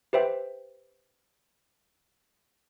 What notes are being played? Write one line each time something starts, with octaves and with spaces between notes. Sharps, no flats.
G4 B4 C5 E5 G5